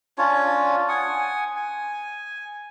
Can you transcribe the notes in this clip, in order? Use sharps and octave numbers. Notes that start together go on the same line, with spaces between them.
C#4 D4 F4 C#5
F#5 G#5 D#6
G#5